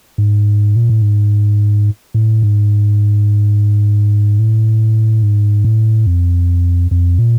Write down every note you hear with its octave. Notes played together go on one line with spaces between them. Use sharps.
G#2
A#2
A2
G#2
A2
G#2
A2
G#2
A2
F2
F2
A#2